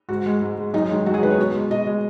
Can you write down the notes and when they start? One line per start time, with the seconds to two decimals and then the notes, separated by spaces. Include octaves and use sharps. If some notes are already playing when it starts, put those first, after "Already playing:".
0.09 G#2 F#4
0.26 G#3
0.41 G#2
0.58 G#3
0.74 F#2 D#4
0.91 D#3 G#3
1.06 F#2 F#4
1.14 G#4
1.23 D#3 G#3 B4
1.30 C#5
1.38 B2
1.55 G#3
1.70 B2 D#5
1.87 G#3